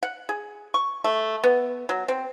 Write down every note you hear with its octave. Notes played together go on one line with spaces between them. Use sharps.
F#5
G#4
C#6
A3
B3
F#3
C4